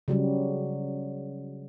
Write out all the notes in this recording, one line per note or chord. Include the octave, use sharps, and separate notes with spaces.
C#3 F#3 G3